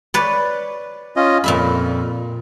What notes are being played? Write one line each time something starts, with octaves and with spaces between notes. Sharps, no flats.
B4 C#5 D5
C#4 F4 D#5
F2 A#2 E5 B5